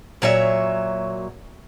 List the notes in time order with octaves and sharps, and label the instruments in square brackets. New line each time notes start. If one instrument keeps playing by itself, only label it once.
[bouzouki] A#2 F#3 C#5 E5